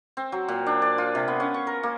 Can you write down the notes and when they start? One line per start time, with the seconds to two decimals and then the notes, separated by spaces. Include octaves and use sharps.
0.17 C4
0.32 F#3
0.48 A#2
0.66 D4
0.82 D5
0.98 F4
1.15 C3
1.28 B3
1.40 C#4
1.54 C#6
1.67 A#4
1.83 A#3